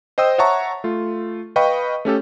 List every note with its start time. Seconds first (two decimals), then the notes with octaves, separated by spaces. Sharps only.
0.18 C5 D#5 G5 D#6 E6
0.38 C#5 E5 F#5 A5 A#5 C#6
0.84 A3 F4
1.56 B4 D#5 F5 G5 B5 C#6
2.05 A3 C#4 G4 A4